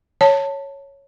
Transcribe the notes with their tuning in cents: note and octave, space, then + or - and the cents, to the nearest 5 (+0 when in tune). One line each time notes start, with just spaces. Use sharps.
C#5 +0 A5 +15